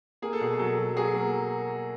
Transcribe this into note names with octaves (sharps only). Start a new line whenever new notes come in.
A#3 G#4
A4
B2 G#4
F#3 A4
F#3
F#3 G#4
A#3